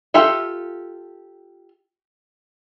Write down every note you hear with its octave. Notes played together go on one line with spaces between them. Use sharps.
F4 G4 A4 E5